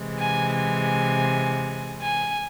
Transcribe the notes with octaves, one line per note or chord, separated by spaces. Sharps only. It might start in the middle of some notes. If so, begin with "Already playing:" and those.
Already playing: C3 E3 G#3
G#5
G#5
G#5